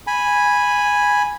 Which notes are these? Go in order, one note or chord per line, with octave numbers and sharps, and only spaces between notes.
G#5 B5